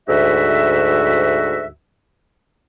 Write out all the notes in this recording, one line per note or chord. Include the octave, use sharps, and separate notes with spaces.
D2 G#2 F#4 E5